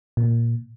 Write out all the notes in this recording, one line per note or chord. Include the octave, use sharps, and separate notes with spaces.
A#2